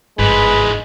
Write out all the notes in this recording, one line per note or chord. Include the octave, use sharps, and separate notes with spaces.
G1 G#2 E3 G#3 B4